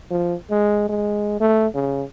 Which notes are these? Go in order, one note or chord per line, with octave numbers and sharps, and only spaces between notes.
F3
G#3
G#3
A3
C#3